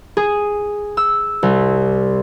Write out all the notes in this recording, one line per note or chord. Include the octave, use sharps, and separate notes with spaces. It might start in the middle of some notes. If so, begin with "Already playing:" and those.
G#4
E6
C2